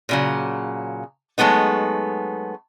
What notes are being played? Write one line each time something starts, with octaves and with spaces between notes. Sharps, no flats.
A#2 C#3 F#3
F#3 G#3 A3 B3 D#4